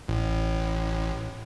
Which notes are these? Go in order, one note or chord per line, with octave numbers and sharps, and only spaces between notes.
A1